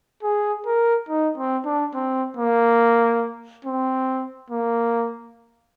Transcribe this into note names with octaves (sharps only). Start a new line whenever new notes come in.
G#4
A#4
D#4
C4
D4
C4
A#3
C4
A#3